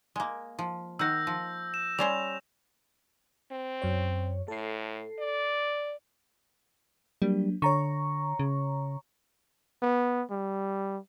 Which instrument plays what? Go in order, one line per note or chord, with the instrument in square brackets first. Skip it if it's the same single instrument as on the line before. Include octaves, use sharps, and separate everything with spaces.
[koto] G#3 A#3
F3
[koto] D#3 F#5 [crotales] E6 G6 A#6
[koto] F3
[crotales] E7
[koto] G3 C#4 C5 [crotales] F7
[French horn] C4
[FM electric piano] F#2 C#5
[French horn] A2 [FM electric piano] A4 C7
[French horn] D5
[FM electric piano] F#3 A#3 D4 [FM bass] G3
[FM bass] D3 [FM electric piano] C#5 A#5 C#6
[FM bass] C#3
[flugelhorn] B3
G3